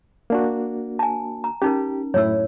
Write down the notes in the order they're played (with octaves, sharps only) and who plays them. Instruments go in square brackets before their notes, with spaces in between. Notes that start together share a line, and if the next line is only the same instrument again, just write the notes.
[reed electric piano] A#3 D4 F#4
[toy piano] G#5 A5
A#5
[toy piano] C#4 D#4 A#4 [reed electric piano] G4
[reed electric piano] F#2 A2 E4 [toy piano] C#5 E6